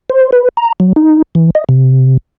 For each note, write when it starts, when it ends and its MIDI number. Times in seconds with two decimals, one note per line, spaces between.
0.10 0.31 72
0.32 0.49 71
0.57 0.72 82
0.80 0.93 54
0.96 1.22 63
1.35 1.50 52
1.55 1.64 75
1.69 2.17 48